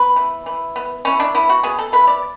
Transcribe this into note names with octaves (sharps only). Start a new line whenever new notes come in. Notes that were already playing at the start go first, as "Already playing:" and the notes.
Already playing: B3 B4
E3
E3
B3
E3 C#4
D4
B3 E4
F#4
B3 G#4
A4
E3 B4
D5